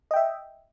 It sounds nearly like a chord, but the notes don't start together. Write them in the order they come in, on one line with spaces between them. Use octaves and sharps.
D#5 G5 E5